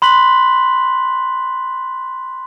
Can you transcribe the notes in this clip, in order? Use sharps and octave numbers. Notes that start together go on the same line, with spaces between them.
B5 C6 F#6 B6 F#7